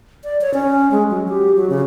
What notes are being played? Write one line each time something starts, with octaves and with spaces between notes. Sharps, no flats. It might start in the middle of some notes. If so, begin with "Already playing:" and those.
D5
C#5
C#4
G#3
F#3
G4
F#3
C#3